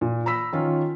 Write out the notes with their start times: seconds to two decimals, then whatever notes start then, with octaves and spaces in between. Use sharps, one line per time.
0.01 A#2
0.26 A#5 B5 E6 B6
0.53 D#3 C#4 F4